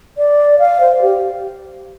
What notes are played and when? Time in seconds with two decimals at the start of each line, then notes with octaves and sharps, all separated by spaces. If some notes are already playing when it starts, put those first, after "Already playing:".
0.17 D5
0.59 F5
0.81 C5
1.02 G4